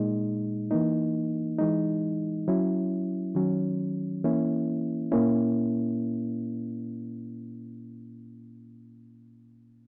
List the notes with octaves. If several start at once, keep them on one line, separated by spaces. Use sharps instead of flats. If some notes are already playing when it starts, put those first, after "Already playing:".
Already playing: A#2 G#3 D#4
E3 A#3 D#4
E3 G#3 D#4
F#3 C#4 E4
D#3 F#3 C#4
E3 A#3 C#4 E4
A#2 A#3 C#4 E4